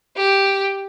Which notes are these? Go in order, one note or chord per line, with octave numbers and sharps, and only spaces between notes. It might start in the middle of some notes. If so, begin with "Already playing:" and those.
G4